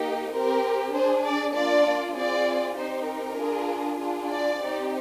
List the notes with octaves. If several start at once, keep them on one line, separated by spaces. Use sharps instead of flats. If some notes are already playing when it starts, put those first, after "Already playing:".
Already playing: A#3 D#4 G4
C4 G4 A#4
D4 G#4 C5
D5
A#3 D4 F4 D5
C4 F4 G#4 D5
C4 D#4 G4 C5
A#4
D4 F4 G#4
D4 F4 G#4
D5
C4 D#4 G4